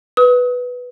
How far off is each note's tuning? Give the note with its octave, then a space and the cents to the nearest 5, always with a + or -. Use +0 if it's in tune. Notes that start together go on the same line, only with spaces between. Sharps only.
B4 +0 D#6 +35